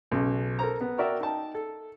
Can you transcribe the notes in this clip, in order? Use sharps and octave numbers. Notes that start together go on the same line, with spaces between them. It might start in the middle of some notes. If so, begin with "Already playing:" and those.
B1 C#3 C#4
A4 A#4 C5 A#5
B3
F#4 A#4 D5 E5 G5
D#4 G5 A5
A4